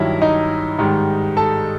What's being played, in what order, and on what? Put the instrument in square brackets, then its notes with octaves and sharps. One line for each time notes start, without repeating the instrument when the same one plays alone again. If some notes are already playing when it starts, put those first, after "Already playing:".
Already playing: [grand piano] G2 D#3 F#3 E4 E5
D#4 D#5
G#2 D#3 G3
A4 A5